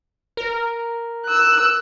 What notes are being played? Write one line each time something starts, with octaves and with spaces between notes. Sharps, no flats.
A#4
E6 F#6